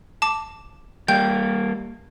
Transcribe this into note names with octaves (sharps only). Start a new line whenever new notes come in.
A5 D6
G3 A#3 G5 G6